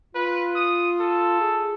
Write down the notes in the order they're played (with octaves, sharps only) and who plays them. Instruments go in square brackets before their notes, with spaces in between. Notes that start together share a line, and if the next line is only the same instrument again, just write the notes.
[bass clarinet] F4 [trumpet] B4
[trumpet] D#6
A4
[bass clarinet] G#4